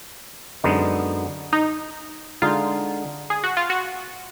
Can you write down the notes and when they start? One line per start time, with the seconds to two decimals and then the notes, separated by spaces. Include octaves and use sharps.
0.64 F#2 D3 G#3 B3 D#4
1.53 D#4
2.42 D3 G#3 D#4 F4
3.30 G#4
3.44 F#4
3.57 F4
3.70 F#4